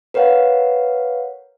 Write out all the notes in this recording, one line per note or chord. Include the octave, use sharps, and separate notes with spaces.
A#4 B4 C#5 F5 F#5